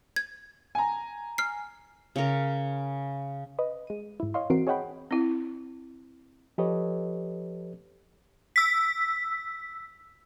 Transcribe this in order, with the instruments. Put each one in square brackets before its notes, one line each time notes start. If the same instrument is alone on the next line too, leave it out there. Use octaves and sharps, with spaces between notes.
[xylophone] G#6
[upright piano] G#5 A#5
[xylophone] F6 C7
[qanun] C#3 A#4
[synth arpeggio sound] B4 D#5
G#3 D#7
G#2 E4
C#5 D#5 F5 C6
E3 C4 F#4 A#4 C7 D7
G#4 C#5 D#5 F#5 G5 B5
[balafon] C4 E4
[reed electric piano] F3 G4 A4 B4 C#5 D#5
[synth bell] E6 B6